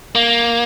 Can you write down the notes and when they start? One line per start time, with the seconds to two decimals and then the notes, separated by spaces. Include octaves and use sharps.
0.15 A#3